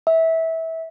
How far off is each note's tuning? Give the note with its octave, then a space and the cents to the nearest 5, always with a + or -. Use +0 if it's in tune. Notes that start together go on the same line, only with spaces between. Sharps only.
E5 -20